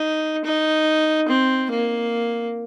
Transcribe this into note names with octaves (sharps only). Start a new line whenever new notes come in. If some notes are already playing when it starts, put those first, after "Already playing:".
Already playing: D#4
D#4
C4
A#3